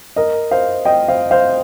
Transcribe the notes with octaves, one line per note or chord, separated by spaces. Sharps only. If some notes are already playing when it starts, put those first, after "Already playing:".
A#4 D#5
C5 F5
D#5 G5
C5 F5
C5 F5